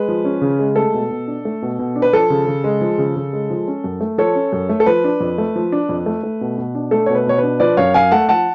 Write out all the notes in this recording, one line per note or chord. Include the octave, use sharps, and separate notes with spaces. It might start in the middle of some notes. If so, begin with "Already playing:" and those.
Already playing: G#3 B4
F3
C#4
C#3
G#3
A3 A4
B2
B2
D4
A3
B2
B2
D4
B4
F3 A4
C#3
C#3
G#3
F3
C#3
C#3
G#3
F3
C#4
F#2
A3
F3 A4 C#5
C#4
F#2
A3
A4
F3 B4
D4
F2
A3
F3
D4
F2
A3
A3
B2
B2
D4
A3 A4
B2 C#5
B4
B2 C#5
B4
D4
F3 B4 D5
F#2 C#5 F5
F#2 F5 G#5
A3 F#5 A5
F3 F#5 A5